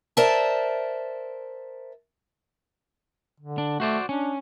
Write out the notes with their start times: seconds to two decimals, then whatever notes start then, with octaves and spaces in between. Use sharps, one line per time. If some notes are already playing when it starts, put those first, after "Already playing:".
0.17 A#4 C5 D5 E5 A5
3.40 D3
3.58 D4
3.80 A3 F#4 C5 D5
4.09 C#4 D4